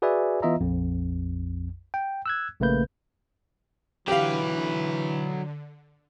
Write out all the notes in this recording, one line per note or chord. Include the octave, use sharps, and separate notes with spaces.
F#4 G#4 B4 D5 E5 G#5
E3 B3 F4 D#5 E5 A#5
A#1 F2
G5
E6 F#6 G#6
A#1 C#3 A3 A#3 B4 G6
D3 E3 F#3 G4 B4 F5